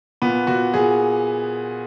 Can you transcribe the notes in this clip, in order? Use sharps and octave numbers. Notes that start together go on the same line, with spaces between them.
A#2 B3
A#2 F#4
A#2 G#4